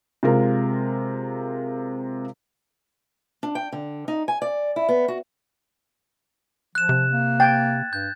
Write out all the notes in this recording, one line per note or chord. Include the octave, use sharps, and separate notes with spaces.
C3 G#3 F4 A#4
D4
G5
D3
D#4
G#5
D5
E4
B3
F#4
F3 F#6 E7
C3
A#3
G5 G#6 A6
G2 G6